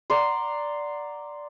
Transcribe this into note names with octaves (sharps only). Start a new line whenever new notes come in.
D5 F#5 A#5 C6